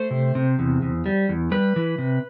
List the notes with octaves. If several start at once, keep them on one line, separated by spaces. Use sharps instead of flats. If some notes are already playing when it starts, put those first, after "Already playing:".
Already playing: A3 C5
C3
C3
E2
E2
G3
E2
G3 B4
E3
C3